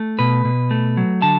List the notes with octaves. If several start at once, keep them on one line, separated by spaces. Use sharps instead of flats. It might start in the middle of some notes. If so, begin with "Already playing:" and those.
Already playing: A3
B2 B4
B2
A3
F#3
D3 A5